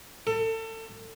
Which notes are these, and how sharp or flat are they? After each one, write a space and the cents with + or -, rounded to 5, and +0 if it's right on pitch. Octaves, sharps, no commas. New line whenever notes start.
A4 +30